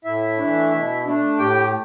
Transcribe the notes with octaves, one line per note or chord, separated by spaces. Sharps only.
A2 E4 E5
E3 A3 D4
B2
A3 D4
A2 G4 G5